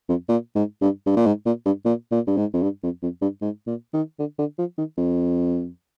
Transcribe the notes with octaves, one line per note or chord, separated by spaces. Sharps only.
F2
A#2
G#2
G2
G2
A#2
G#2
A#2
G2
A#2
A#2
G2
G#2
F2
G2
F2
F2
G2
G#2
A#2
D#3
D3
D3
F3
D#3
F2